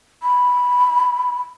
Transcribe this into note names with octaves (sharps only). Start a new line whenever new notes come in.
B5